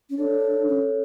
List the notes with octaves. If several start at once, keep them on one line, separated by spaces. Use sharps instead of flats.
C#4
D4 A4 C#5
C#4